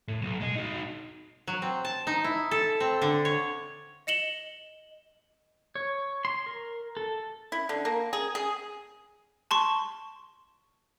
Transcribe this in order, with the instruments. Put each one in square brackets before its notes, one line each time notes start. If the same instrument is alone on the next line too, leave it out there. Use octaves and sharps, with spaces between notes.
[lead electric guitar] A2
B1
G#3 D#5
D#4 F#4
[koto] F#3
C4
A5
D#4
E4
A4
C4
D3
C#5
[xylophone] D#5 C#7 E7 F#7 G7
[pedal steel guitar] C#5
C6
A#4
A4
[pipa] E4
D3
A#3
G#4
G#4
[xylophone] A5 C6 C#6